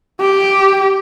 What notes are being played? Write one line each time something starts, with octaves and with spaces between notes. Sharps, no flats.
G4